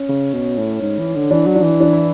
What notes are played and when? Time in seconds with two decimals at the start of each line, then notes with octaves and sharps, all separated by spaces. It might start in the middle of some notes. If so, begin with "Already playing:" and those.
Already playing: C#4
0.09 C#3
0.33 B2
0.59 A2
0.82 G#2
0.99 E3
1.15 D3
1.31 E3 D4
1.47 F#3
1.55 D4
1.63 E3
1.80 D4
1.93 E4